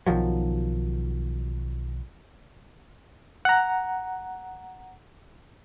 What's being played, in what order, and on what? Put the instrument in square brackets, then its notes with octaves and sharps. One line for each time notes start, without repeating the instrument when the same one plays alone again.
[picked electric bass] B1 D#3 F3 F#3
[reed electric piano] F#5 A#5